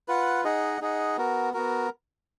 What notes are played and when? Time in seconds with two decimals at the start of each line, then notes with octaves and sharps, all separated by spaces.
0.08 F4 B4 F#5
0.44 D#4 G#4 D#5 F#5
0.81 D#4 G#4 D#5 F#5
1.17 B3 F#4 A#4
1.53 B3 F#4 A#4